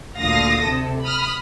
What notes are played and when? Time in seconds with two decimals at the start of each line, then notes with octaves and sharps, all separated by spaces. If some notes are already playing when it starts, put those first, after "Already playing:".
0.18 D2 A#2 D3 F5 D#6 A#6
0.65 C3 A4
1.03 B5 D#6 F6